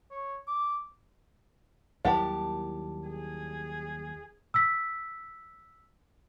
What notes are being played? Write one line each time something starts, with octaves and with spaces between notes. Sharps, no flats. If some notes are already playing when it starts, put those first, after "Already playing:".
C#5
D6
D#2 F#3 G3 E4 G4 A#4 F#5 A5
G#4
E6 B6